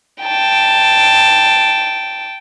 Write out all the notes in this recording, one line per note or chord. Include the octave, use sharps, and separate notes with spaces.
G5 A5